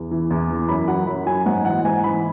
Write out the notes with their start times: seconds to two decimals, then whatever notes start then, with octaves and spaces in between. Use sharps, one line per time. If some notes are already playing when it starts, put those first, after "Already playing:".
Already playing: E2
0.11 E3
0.31 E2
0.50 E3
0.69 F#2 B5
0.88 F#3 F#5
1.07 F#2 B5
1.26 F#3 G#5
1.46 G#2 F#5
1.65 E3 F#5
1.85 G#2 G#5
2.04 E3 B5